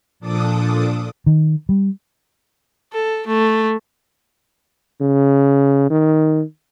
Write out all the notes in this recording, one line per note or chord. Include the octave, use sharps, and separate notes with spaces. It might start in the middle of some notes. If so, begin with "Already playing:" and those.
A#2 F3 D4 A4 D6 D#6
D#3
G3
A4
A3
C#3
D#3